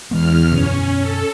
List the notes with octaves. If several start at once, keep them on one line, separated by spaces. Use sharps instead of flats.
E2 E3 G#3 B3 F6
F#2 B2 D3 C#4
A4